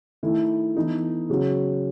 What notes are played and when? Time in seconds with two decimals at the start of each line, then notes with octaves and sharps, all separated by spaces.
0.23 D#3 A3 E4 A4
0.76 E3 B3 D#4 A4
1.29 C#3 F#3 C#4 F#4